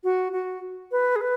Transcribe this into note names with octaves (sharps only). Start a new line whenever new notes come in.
F#4
F#4
B4
G#4
B4